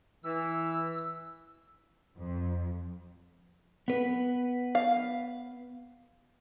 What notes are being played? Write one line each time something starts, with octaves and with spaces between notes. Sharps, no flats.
E3 E6
F2
B3 B4
F5